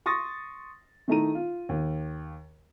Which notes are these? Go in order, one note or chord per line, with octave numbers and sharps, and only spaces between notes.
C6 C#6 D#6 A6 A#6
D#3 A3 D#4 E4 A#5 D#7
F4
D#2